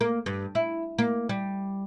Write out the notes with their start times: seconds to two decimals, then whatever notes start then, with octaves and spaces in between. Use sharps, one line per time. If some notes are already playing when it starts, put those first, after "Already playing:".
0.01 A#3
0.26 G2
0.55 E4
0.98 A#3
1.29 G3